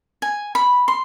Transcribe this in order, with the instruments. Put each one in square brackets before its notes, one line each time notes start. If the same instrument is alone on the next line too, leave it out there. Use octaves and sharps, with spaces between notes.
[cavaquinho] G#5
B5
C6